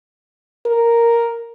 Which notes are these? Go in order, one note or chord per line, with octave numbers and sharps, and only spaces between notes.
A#4